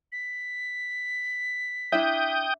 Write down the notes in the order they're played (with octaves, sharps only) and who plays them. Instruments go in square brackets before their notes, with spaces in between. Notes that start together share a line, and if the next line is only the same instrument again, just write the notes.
[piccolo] B6
[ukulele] D4 E4 E5 [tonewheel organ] G5 D#6 G6